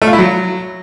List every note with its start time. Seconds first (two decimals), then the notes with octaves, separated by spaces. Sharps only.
0.02 A3
0.07 F4
0.13 E4
0.19 F#3